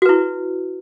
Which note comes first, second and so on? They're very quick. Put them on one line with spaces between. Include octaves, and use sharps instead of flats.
F#4 B4 E4